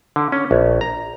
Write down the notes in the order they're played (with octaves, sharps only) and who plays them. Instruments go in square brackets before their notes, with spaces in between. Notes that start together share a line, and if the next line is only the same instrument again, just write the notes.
[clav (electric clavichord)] D3
C#4
A#1
A#5